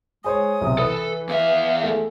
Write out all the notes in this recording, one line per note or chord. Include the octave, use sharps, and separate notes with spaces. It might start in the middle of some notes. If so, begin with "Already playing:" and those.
G#3 G#4 C5 C#5 D#6
B1 C3
E3 E4 A4 B4
E2 E5 F5
A3 G#4 A4